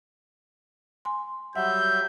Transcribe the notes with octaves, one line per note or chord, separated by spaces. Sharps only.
G#5 C6
F#3 G3 E5 F#5 G6